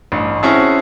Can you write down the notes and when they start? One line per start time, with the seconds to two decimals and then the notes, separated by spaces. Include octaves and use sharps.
0.12 A1 G2
0.43 C4 C#4 E4 F#4 G#4 A4